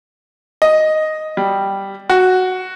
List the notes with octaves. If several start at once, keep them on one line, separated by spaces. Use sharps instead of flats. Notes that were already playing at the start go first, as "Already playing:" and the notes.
D#5
G3
F#4